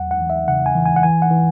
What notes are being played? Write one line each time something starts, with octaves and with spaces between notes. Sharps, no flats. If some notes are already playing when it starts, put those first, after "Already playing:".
Already playing: E2 F#3 F#5
F#5
E3
E5
C#3 F#5
G#5
E3
G#5
F#5
E3 G#5
F#5
E3